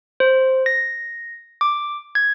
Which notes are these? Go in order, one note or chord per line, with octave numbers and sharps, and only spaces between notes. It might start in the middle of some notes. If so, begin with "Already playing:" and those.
C5
A#6
D6
G#6